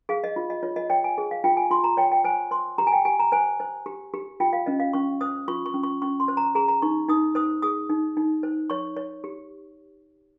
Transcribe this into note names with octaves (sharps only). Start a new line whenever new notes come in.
G#4 F5
D#5
F4
D#5
F4 C#5
D#5
C#5 G5
G#5
G#4
F5
F4 G5
G#5
F4 C6
A#5
C#5 G5
G5
C5 G#5
C5 C6
G4 A#5
G#5
G5
G4 G#5
A#5
C5 G#5
C5
G4
G4
F4 G5
F5
C#4 D#5
F5
C#4 C#6
C5 D#6
F4 C#6
C#6
C#4
C#6
C#4 C#6
C6
C5
A#5
G#4 A#5
A#5
D#4 C#6
D#4 D#6
C5 D#6
G#4 D#6
D#4
D#4
C5
C#5 C#6
C#5
G4